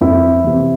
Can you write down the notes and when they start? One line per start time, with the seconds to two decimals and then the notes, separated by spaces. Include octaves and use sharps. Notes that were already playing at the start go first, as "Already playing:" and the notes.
0.01 F2 E4
0.44 C3 E3